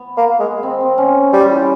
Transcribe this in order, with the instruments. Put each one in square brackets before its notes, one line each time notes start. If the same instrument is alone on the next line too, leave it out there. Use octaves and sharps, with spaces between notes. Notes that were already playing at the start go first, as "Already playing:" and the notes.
Already playing: [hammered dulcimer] B3
[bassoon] A#3
G#3
[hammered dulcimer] C4
C4
C#4
[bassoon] G3
[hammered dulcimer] F4
E4